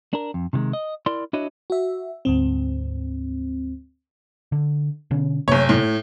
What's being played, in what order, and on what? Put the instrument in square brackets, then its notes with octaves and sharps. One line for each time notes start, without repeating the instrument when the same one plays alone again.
[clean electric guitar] D4 A#4
F2
C3 D#3 F#3 G#3
D#5
E4 A#4 D5 C6
D4 E4 F#4 C#5 D#5
[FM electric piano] F#4 E5
D2 G#2 C4
[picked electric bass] D3
B2 D3 C#4
[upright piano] F#1 C#5 [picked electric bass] C3 A3 A#3
[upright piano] A2